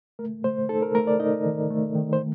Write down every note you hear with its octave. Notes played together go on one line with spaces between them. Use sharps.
A3 A#4
A3 C5
D#4 A4
A#4
A3 A#4
D5
D#4 D#5
D#3
A3
D#3
C5